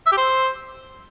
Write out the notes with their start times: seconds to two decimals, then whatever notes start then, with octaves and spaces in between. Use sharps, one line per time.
0.06 E5
0.12 G4
0.17 C5